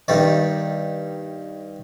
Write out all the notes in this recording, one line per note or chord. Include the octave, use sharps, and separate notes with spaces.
G2 D#3 D5